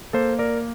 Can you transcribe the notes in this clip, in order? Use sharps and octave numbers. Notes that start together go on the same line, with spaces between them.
A#3 A4 C5
A#4 D5